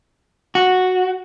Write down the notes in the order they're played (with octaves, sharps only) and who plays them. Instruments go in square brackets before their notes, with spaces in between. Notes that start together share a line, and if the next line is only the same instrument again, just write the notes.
[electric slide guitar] F#4